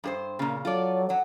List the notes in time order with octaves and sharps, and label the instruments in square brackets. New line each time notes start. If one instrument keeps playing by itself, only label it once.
[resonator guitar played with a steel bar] G2 G#4 C5
[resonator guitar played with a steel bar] A#2 C#3 [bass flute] A#3
[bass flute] F#3 [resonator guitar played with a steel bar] F4 A4 D5
[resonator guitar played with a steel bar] F#3 [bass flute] F#5